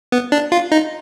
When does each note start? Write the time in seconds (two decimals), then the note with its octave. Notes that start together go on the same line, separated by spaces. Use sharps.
0.12 B3
0.32 D4
0.52 F4
0.72 D#4